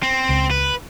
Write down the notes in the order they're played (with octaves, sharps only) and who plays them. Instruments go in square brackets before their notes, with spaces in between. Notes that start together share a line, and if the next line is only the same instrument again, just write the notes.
[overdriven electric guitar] C4
[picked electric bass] C#2
[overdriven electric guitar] B4